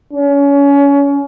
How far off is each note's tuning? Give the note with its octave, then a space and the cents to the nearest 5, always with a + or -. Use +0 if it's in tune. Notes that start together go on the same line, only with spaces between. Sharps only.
C#4 +30